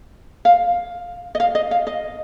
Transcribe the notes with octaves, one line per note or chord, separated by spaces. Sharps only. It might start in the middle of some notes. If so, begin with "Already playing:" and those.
F5
D#5
F5
D#5
F5
D#5